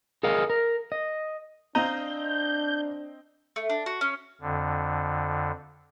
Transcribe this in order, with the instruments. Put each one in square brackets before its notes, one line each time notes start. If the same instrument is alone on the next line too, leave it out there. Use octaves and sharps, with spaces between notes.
[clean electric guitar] G#4 A#4 D#5 F5
A#4
D#5
[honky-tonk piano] C4 D#5 D#7 [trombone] D4 [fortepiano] F5 A#5 [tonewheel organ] G6
[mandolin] A3
D4
F#4
C#4
[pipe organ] F2 D3